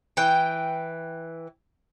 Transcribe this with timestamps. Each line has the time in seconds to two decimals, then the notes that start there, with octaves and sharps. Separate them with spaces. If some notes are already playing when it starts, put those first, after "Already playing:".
0.17 E3 G5